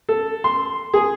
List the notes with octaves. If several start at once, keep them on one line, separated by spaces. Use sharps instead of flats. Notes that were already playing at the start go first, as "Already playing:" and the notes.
A4
C6
G#4